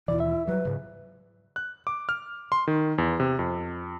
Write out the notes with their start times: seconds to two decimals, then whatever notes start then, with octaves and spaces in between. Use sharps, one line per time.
0.08 D#2 B2 E3 E4 D5
0.20 E5
0.47 F#3 G3 B4
0.65 G#2 C#3
1.56 F#6
1.87 D6
2.09 F6
2.52 C6
2.67 D#3
2.98 E2
3.20 C3
3.39 F2